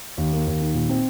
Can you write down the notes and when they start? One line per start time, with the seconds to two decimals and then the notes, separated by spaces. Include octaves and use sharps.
0.18 D#2
0.33 A#3
0.47 D#2
0.61 D#3
0.74 A#2
0.89 C4